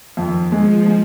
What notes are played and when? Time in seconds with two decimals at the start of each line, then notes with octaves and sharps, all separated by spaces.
0.17 F2 D#3
0.52 F3 G#3
0.87 G#3